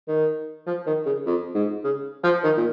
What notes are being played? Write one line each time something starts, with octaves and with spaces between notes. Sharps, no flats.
D#3
F3
D#3
C#3
F2
G#2
C#3
F3
D#3
A#2